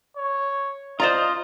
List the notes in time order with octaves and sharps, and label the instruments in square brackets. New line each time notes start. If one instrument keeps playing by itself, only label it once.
[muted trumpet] C#5
[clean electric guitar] F4 [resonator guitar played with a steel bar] C5 D5 A#5 [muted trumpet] D#5